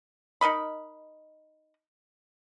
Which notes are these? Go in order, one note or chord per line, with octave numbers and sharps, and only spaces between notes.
D#4 A#4 D#5 B5